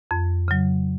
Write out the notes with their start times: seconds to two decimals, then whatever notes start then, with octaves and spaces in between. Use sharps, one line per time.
0.11 F2
0.48 C#3 F#3